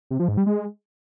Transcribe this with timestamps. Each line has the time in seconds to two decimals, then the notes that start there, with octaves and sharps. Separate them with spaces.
0.11 C3
0.19 F3
0.28 G#2
0.37 G3
0.46 G#3